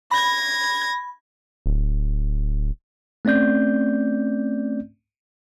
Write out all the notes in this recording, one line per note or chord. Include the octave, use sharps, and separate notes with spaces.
B5 G#6 A#6
D1
A3 C4 C#4 D5 G6